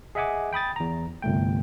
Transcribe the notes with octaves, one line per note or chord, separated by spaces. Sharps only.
G#4 D#5 E5 F#5 G#5 D6
G5 B5 D#6 A6
E2 A#5
G1 C2 A3 G5